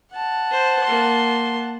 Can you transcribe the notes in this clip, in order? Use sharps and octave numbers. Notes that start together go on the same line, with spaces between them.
F#5 A5
C5
A#3 C6